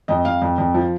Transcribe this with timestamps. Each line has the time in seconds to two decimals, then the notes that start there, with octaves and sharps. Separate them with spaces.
0.08 F2 D#5
0.25 F2 F5
0.42 F2
0.58 F2
0.75 F3